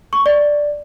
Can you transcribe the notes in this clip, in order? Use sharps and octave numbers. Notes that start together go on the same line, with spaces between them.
C#6
D5